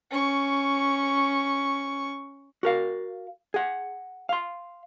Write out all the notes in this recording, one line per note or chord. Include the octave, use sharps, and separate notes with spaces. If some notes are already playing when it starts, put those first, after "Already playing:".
C#4 C#6
F#4 A#4 F5
G#4 F#5
F5 C6